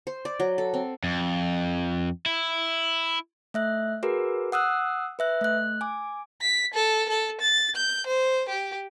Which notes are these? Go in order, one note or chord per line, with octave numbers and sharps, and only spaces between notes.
C5
D5
F#3
A4
C4
F2
E4
A3 E5 F#6
F#4 G#4 A#4 B4
F#5 D#6 E6 F#6
B4 E5 F#6
A3 F#6
G#5 D6
B6
A4
A4
A6
G6
C5
G4